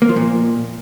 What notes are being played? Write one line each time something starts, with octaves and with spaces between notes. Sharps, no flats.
A#3
F3
A#2